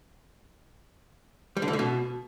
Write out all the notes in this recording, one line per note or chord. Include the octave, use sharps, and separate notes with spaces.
G3
D3
E3
D3
B2